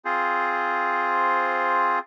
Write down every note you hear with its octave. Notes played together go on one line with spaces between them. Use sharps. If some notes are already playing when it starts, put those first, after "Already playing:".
C4 F4 G#4 C5